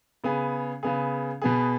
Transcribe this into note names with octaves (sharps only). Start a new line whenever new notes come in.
C#3 B3 G#4
C#3 B3 G#4
B2 B3 G#4